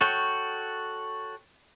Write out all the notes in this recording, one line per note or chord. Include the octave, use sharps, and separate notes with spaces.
F#4 A4 C#5 G5